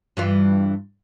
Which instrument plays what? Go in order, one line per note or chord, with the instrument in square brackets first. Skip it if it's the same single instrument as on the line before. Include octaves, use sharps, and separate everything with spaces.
[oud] G2 E3 F4